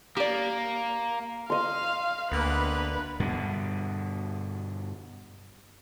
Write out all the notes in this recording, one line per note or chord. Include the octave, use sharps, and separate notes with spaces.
A#3 G4 D5
D#5 F5 C6
D2 A#3 B3 D4 B4
G2 B2 D3